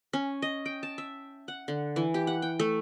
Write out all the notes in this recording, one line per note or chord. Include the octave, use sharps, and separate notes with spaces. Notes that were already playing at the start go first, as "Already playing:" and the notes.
C#4
D#5
G5
A5
E5
F#5
D3
E3
G4
F#5
G5
A3